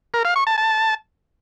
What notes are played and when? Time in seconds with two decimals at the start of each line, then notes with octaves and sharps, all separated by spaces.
0.14 A#4
0.25 F5
0.36 C#6
0.47 A5
0.58 A5